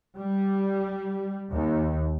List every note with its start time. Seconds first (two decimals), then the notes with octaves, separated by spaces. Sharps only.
0.17 G3
1.53 D#2